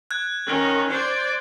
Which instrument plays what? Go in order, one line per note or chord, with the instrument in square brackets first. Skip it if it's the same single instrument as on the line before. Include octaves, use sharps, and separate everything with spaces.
[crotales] F#6 G#6
[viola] D#3 C#4
C5 D5